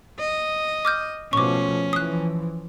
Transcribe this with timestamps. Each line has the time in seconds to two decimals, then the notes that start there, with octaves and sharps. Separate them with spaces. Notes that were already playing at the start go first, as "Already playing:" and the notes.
0.19 D#5
0.85 D6 F6 G6
1.33 B2 F3 A3 C#4 C#6 D6
1.93 E3 F3 D#6 F#6